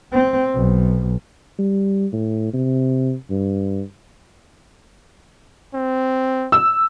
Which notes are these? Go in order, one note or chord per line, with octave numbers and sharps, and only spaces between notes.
C4
B1
G3
A2
C3
G2
C4
E6